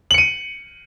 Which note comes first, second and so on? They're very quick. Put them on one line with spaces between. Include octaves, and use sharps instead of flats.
F#7 C#7 D#7